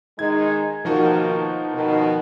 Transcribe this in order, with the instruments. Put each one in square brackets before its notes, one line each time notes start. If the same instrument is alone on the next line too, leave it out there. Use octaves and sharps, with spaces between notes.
[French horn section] D#3 G#3 D#4 [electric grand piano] G#6
[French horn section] B2 D#3 A#3 [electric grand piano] F3 D#4 F#4
[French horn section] B2 D#3